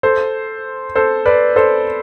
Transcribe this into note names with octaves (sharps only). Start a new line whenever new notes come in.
A4 C5
A4 C5
B4 D5
A4 C5